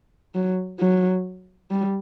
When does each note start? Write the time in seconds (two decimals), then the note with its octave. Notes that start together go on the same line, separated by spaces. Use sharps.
0.35 F#3
0.80 F#3
1.71 G3